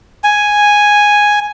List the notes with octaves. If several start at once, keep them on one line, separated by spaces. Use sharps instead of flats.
G#5